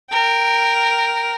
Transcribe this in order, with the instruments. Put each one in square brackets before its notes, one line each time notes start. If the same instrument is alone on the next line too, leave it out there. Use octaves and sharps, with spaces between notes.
[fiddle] A#4 G5